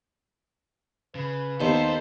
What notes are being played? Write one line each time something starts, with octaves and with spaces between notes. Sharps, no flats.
C#3 B4
D#2 B3 A4 C5